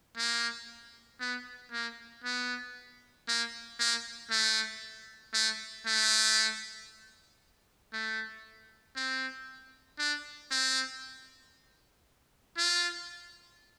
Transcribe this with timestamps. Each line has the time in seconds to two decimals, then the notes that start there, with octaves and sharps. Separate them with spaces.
0.17 A#3
1.21 B3
1.72 A#3
2.25 B3
3.28 A#3
3.80 A#3
4.31 A3
5.34 A3
5.87 A3
7.93 A3
8.97 C4
9.99 D4
10.51 C4
12.58 F4